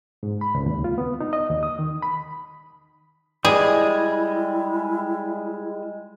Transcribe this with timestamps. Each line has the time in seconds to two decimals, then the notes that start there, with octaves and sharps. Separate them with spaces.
0.23 G#2
0.41 B5
0.55 C#2
0.66 D#2
0.84 F4
0.98 B3
1.21 D#4
1.33 D#5
1.50 D#2
1.63 D#6
1.79 D#3
2.03 B5
3.45 G3 G#3 E4 G#4 D5 D#5 G#5